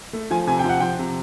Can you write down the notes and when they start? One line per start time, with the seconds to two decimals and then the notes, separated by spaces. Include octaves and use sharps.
0.13 A3
0.31 F3 G#5
0.47 C3 G#5
0.59 F3 G5
0.69 F#5
0.80 F3 G5
0.99 C3